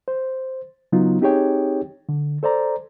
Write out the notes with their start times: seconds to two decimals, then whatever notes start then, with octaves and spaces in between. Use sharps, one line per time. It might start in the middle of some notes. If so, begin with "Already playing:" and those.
0.08 C5
0.92 C#3 F#3 B3 D#4 F4
1.21 C4 D#4 G4 G#4 C#5 G5
2.09 D3
2.43 A4 C5 D5 A#5